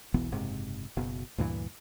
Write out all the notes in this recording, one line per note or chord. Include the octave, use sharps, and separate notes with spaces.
E1 B1 E3 B3
F#1 G#2 C3
F#1 B2
D2 G2 A#2 E3